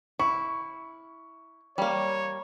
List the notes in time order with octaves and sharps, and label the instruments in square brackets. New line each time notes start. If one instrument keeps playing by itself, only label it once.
[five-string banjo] E4 [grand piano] C#6
[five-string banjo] G3 A#3 [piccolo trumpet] C#5